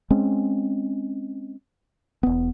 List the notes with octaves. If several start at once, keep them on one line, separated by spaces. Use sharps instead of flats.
G#3 C4 C#4
E1 B3